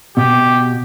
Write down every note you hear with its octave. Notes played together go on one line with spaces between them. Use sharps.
B2 G4